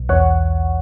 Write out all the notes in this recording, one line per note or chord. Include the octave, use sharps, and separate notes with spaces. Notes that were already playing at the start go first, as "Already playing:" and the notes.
Already playing: B1
E2 C#5 F#5